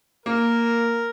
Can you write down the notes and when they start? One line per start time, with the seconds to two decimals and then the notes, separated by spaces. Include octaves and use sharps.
0.26 A#3 A#4